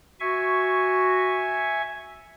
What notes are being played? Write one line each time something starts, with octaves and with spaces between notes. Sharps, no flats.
F#4 E5 G#5 C#6